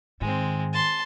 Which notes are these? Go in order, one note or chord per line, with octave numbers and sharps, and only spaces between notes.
G#2 D#3 G#3 C4
A5 C6